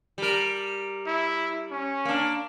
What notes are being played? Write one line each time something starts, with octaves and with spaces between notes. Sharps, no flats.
G3 A#4
E4
C#4
A#3 D4